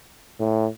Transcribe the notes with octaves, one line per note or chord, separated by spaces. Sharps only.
A2